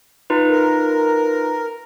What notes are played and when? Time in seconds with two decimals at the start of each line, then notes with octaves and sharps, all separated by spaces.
0.30 D#4 F4 B4
0.50 A#4